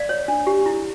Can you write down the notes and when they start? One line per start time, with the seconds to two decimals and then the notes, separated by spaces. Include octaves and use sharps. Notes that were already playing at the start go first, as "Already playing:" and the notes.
Already playing: D5 F5
0.09 C#5
0.28 D4
0.47 G4
0.66 E4